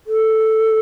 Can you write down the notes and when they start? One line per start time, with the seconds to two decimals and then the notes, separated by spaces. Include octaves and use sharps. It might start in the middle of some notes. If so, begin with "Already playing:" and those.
0.07 A4